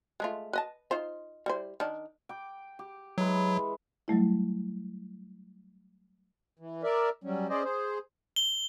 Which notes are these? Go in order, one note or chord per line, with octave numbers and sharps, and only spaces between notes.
G#3 A3 F4
B4 D#5 A5
D#4 F4 C5
G3 E4 C5
D#3 D4
G5 D6
G4
E3 F#3 G#3 B4
F#3 G3 A3 E4
E3
A#4 D5 E5
F#3 G3 C#4
C#4 G#4 C5 D5 D#5
G#4 C5
G7